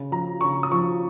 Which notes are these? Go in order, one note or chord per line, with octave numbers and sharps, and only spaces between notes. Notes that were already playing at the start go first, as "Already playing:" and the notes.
Already playing: C#3
F3 A#5
C#3 C#6
D#6
F3 C#6